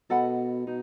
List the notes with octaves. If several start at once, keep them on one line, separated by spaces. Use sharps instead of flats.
B2 A4 D#5 F#5 B5
B2 D#4